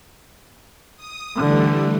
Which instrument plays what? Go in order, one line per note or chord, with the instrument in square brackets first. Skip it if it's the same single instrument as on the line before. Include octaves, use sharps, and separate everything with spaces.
[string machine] D#6
[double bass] D3 [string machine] E3 G3 A3